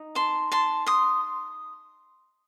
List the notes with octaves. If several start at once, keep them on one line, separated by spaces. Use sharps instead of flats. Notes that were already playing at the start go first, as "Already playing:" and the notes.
Already playing: D#4
A5 C6
A5 C6
C6 D#6